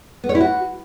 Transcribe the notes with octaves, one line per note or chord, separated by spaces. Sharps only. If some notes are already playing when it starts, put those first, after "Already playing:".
B3
C#5
E4
F#4